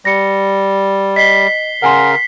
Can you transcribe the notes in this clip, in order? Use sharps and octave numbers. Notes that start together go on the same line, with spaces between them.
G3 A#6 C#7
D#5 B6 C7 G7
C#3 A#4 F#5 G#5 C6